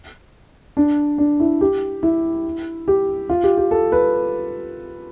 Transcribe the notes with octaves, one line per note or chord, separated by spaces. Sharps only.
D4
D4
E4
G4
E4
G4
F4
G4
G4
A4
B4